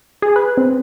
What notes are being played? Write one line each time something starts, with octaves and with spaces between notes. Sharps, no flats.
G#4
B4
C4